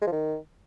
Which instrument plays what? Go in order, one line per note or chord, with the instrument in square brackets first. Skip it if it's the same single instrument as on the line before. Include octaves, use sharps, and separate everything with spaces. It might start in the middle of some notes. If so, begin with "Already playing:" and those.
[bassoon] G#3
F3
D#3